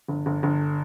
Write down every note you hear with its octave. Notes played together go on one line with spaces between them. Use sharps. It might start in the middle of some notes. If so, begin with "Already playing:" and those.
G1
G1
G1